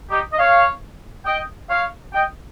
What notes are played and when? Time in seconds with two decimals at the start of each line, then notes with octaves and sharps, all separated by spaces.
0.10 D#4 G4
0.33 D#5
0.39 C#5 F5
1.26 D#5 G5
1.69 C#5 F5
2.13 D#5 G5